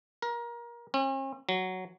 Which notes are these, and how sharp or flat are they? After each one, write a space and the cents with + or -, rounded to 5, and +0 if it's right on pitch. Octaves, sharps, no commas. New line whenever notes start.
A#4 +25
C#4 -45
F#3 +5